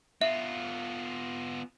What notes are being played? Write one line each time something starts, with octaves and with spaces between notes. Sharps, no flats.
B3 F4 E5